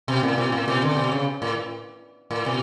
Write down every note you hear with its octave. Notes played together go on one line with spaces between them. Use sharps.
B2
A2
B2
A2
B2
D3
B2
C#3
A2
A2
B2